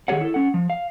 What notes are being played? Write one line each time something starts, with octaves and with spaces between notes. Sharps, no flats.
D#3 G4 G#4 C#5 F#5
E4 A4
C#4 F#5
F3
F5